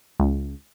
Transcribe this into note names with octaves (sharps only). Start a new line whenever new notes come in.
C#2